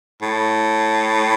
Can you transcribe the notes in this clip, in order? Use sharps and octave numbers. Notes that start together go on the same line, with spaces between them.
A2